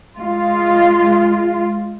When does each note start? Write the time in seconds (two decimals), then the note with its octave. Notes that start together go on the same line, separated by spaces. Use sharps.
0.17 G#3 F4